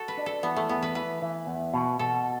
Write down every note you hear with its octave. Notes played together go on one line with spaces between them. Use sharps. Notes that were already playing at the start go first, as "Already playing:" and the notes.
Already playing: F#4 A4
B4
D4
A4
E3 B3
A3
E2 B3
B4
E3 B4
E3
E2
B2
B2 A4